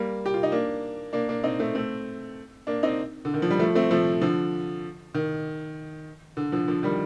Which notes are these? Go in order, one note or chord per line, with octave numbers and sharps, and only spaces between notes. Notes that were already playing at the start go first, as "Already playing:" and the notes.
Already playing: G3 A#3
G4
F4
D#4
A#3 D4
A#3 D4
A#3 D4
C4 D#4
A3 C4
A3 C4
A#3 D4
C4 D#4
D3
D#3
F3
G3
F3 A3
A3 C4
F3 A3
D3 F3
D#3
D3
D3 F3
D3 F3
D#3 G3